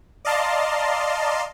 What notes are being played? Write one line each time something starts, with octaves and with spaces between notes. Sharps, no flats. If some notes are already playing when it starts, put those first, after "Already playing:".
D5 D#5 F5 A5 A#5 C6